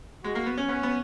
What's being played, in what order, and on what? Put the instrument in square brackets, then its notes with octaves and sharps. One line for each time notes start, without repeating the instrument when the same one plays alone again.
[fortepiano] G#3 [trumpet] F#4
[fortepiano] A#3
B3
C#4
[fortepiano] B3 [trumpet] C#4
[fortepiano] B3